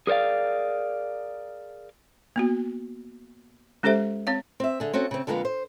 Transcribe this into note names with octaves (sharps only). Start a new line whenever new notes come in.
G#4 A#4 C5 D5 F5
A#3 B3 F#4
G#3 C#4 G4 A4 C5 E5
C4 C#5 F5
C4 E5
D3 G#4
C4 C#4 F#4 A4
C#3 C4
F2 D3 G#3 A#3 B3 F5
C5